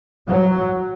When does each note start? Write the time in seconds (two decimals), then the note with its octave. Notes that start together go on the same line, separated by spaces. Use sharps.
0.28 F#3